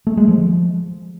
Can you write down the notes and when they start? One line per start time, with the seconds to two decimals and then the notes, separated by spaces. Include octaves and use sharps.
0.07 A3
0.17 G#3
0.28 F3